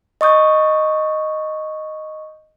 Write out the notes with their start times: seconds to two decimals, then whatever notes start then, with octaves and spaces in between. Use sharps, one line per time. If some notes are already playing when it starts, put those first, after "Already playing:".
0.21 D#5 C#6 D#6 G6